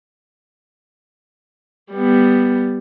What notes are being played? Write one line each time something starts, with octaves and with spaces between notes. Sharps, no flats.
G3 B3